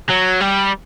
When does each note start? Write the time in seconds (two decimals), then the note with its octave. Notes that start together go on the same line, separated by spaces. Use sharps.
0.09 F#3
0.40 G3